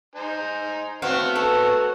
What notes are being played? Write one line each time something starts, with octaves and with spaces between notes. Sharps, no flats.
D#4 C5 G#5
A3 B3 C4 F#4 C#5 F5
A4